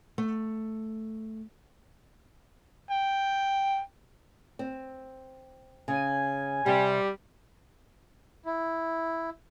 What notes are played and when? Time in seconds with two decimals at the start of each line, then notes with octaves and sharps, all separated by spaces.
0.18 A3
2.91 G5
4.59 C4
5.88 C#3 G#5
6.66 C3 G3
8.46 E4